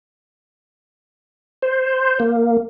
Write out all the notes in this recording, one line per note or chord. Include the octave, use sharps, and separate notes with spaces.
C5
A#3